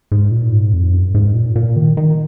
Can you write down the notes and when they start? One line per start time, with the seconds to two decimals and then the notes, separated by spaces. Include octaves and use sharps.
0.12 G#2
0.31 A#2
0.52 G#2
0.73 F2
0.93 F#2
1.14 G#2
1.35 A#2
1.56 A#2
1.76 D#3
1.97 D#3